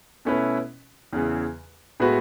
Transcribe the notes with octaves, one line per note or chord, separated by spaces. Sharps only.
B2 A3 C#4 E4 B4
E2 C#3 E3
A2 G#3 B3 F#4 B4